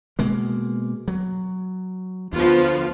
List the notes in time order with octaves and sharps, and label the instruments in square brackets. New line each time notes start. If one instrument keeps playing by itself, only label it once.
[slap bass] B2 G#3 A#3
F#3
[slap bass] D2 [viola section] F3 B3 F4